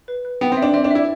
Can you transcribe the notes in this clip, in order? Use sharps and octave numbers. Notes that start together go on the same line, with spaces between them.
B4
B4
B3 G5
C4
E5
D4
C4 E5
D4
E4 E5